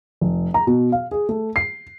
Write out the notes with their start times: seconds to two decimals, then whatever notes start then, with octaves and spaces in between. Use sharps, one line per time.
0.21 F1
0.54 A#5
0.67 B2
0.92 F5
1.11 G#4
1.29 A3
1.56 C7